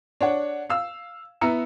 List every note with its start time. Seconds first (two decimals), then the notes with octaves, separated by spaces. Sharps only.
0.21 D4 C#5 F#5
0.70 F5 E6
1.41 B3 E4 A#5 E6 C#7